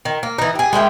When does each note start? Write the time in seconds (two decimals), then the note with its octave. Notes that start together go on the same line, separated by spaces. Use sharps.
0.05 D#3
0.23 A#3
0.38 E3 D#4
0.55 G4 G#4
0.73 G#3 A#3 E4 G5